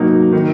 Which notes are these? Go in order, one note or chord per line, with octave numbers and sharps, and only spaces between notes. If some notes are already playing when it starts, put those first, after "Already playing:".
Already playing: C3 F#3 A#3 D#4
D#3